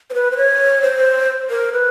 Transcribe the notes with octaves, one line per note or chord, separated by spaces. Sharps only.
C5
B4
C5
C#5
C5
A#4
B4